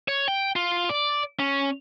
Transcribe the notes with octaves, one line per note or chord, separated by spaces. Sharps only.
C#5
G5
F4
D5
C#4